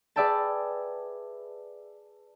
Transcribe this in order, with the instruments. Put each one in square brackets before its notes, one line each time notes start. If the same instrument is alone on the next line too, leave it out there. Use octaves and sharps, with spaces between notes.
[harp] G#4 B4 D5 E5 G5 A5